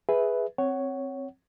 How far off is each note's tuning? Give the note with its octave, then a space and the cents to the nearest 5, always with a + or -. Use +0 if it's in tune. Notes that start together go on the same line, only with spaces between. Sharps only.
G#4 +0 B4 +0 E5 +0
C4 +5 C#5 +0 F#5 +20